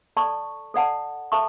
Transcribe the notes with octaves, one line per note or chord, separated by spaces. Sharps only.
A4 D5 A5 C#6
A4 D5 F#5 A5
A4 E5 A5 C#6